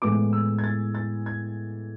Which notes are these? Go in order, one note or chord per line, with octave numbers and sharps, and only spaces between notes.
A2 E3 G#3 B3 D6
E6
G#6
A6
A6
G#6